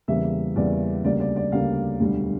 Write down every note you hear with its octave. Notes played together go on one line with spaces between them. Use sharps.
E2 C#3 E3 G3 A#3 E5
E2 C#3 E3 G3 A#3 D5
D2 C#3 G3 A#3 D5
D5
D5
D2 C#3 G3 A#3 F5
E1 D2 D3 G3